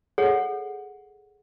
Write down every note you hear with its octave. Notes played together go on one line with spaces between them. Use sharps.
G#4 A4 C#5 F#5